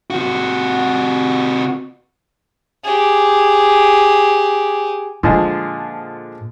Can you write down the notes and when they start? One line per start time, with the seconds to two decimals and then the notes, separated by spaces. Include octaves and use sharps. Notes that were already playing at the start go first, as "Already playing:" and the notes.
0.10 C3 F#4
2.84 G4 G#4
5.23 A#2 D3 F3 G#3